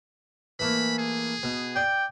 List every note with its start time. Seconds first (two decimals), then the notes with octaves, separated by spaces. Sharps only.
0.59 E3 A3 A#3 B5
0.98 G#4
1.43 B2
1.76 D5 G5